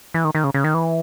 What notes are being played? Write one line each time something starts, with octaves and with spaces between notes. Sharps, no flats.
E3
D#3
D#3
C#3
C#3
D#3
E3